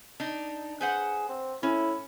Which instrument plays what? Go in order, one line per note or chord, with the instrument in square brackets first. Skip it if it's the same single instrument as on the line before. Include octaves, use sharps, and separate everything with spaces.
[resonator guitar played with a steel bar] D4 D#4
[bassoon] G#4 [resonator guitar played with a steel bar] B4 C5 F#5
[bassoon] C4
[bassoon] A2 [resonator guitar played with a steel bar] C#4 [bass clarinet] E4